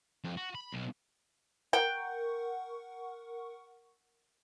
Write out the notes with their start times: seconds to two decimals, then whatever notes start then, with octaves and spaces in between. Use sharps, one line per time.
0.24 F2
0.37 F#4
0.55 B5
0.73 B1
1.73 A#4 F#5 G5 C#6